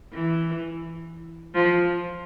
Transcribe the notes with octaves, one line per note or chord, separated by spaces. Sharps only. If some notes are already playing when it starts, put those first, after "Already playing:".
E3
F3